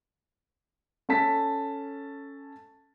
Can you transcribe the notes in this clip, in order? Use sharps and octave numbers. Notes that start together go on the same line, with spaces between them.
C#4 A4 A5 B6